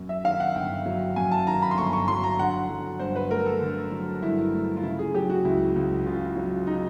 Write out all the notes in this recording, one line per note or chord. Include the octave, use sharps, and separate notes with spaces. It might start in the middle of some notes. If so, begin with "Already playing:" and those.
Already playing: F#2
E5
D#3 F5
F#5
G1 G5
F#3
F#2 G#5
A5
D#3 A#5
B5
C6
G1 C#6
C#6
F#3 C6
A#5
D3 F#5
F#3
G2 C5
B4
A3 A#4
A4
D3
F#3
G2 E4
A3
F4
C#3 E4
G#4
F#3 G4
F#4
C#2 E4
C#2
C#3 F4
F#3
D#4